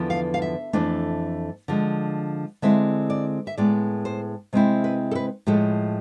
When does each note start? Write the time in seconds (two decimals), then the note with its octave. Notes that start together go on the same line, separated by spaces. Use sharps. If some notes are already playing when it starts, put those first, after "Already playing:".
Already playing: E2 D3 F3 B3 E4
0.10 F5
0.34 F5
0.42 E5
0.73 F2 E3 A3 D4
1.68 D3 F3 G#3
2.62 D3 G#3 C4 E4 E5
3.10 D5
3.47 E5
3.58 A2 G#3 B3 D5
4.05 C5
4.53 C3 G#3 C4 E4
4.84 B4
5.11 A4
5.15 B4
5.47 A2 F3 G#3 A4